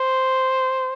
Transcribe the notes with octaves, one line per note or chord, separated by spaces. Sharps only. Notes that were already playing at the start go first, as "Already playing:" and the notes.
Already playing: C5